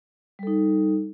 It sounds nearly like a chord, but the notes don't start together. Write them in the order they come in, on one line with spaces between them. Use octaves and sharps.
G3 A4 D#4